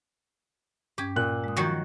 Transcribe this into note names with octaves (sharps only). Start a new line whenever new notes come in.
G2 C#4 G4 G#6
A#2 F#6
G#3 D#6
D#3 F3 F#3 F4 F#4 G6